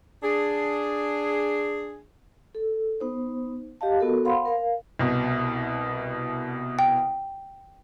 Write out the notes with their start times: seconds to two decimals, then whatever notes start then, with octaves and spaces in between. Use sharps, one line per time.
0.23 D4 G#4
2.55 A4
3.00 B3 D#4 C5
3.81 G4 D#5 F5 A5
4.00 B3 F#4 A4 A#4
4.25 C5 F5 F#5 B5 C6
4.45 A#4 F5
4.99 C2 B2
6.79 G5